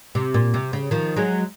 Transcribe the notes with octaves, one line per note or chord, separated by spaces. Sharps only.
C3
A#2
C3
C#3
D#3 F3
F#3 G#3